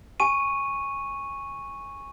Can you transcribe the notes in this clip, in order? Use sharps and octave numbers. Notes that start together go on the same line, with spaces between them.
G#5 C#6 D#7